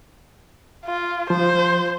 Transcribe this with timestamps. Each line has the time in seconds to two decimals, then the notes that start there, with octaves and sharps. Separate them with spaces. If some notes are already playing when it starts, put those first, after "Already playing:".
0.86 F4
1.30 F3 C5